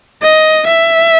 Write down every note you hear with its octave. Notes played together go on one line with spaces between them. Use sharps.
D#5
E5